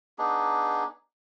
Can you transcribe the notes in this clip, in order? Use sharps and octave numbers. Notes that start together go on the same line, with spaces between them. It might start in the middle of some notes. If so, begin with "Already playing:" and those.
B3 D4 D#4 G#4